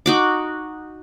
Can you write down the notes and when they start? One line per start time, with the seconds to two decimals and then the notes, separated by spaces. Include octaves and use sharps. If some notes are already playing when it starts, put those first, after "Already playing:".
0.06 D#4 F#4 D6